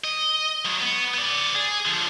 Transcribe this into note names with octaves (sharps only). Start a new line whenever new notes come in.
D#5
F#3 G#3
B3
B3 D5
G#4
D3 F3